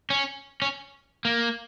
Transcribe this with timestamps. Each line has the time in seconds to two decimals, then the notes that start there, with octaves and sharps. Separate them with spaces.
0.10 C#4
0.62 C#4
1.25 A#3